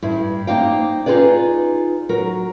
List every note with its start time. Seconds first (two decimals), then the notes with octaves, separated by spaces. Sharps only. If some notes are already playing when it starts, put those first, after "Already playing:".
0.02 G2 E4
0.47 A#3 D#4 C5 D5 F5 G5
1.06 D#4 F4 G#4 B4 D5
2.09 F#3 A#4